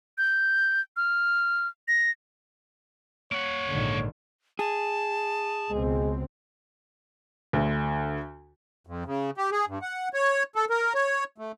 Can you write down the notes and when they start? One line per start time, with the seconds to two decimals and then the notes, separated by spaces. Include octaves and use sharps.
0.18 G6
0.97 F6
1.88 A#6
3.32 A#3 C#5 F#5
3.70 A#1 G#2 D3 D#3
4.59 G#4 A5
5.70 C#2 B2 G#3 C4
7.53 D2 D3
8.87 F2
9.06 C#3
9.37 G4
9.52 G#4
9.68 G2
9.82 F#5
10.13 C#5
10.56 A4
10.70 A#4
10.94 C#5
11.38 A3